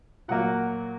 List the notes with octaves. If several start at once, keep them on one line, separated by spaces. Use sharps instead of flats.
A#2 F#3 A#3 F#5